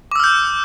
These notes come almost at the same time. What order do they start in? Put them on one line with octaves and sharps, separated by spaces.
D6 E6 F6 G6